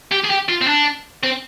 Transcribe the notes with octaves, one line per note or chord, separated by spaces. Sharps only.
G4
G#4
G4
F4
C4
D4
C4